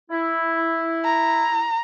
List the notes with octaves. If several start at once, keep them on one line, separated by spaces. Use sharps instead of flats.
E4
A#5